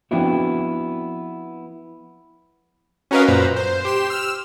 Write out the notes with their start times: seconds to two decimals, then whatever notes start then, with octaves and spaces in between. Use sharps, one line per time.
0.11 F3 B3 C4 D4 E4 F#4
3.11 C#4 F#4 A#4 B4 D#5 F5
3.27 F#2 A#2 B4 C5 A#5
3.56 C5
3.85 G4 C6 E7
4.10 E6 F6 E7